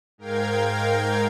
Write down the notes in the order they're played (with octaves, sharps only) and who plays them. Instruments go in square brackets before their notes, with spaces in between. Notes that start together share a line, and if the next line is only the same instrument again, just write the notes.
[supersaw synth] G#2 A#4 F5 G5 G#6